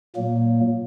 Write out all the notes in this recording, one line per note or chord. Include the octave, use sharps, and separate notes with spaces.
A#2 F#3 A#3